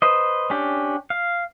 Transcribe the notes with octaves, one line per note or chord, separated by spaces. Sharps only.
B4 C5 D#5
C#4 D4 G4
F5